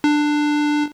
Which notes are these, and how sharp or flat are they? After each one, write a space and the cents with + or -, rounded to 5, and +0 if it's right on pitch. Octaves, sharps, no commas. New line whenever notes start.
D4 +15